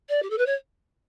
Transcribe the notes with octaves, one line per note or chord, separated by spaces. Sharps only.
D5
G4
A4
B4
C#5